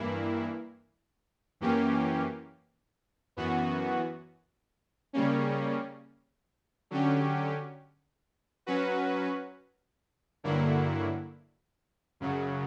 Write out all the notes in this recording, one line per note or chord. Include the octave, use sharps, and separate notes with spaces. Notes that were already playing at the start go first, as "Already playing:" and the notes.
Already playing: G2 E3 A#3 E4
F#2 E3 A#3 C#4 G4
F#2 E3 B3 F#4
C#3 G3 A#3 C#4
D3 F#3 C#4 G4
F#3 C#4 F#4 B4
G2 D3 F#3 A#3 E4
F#2 C#3 F#3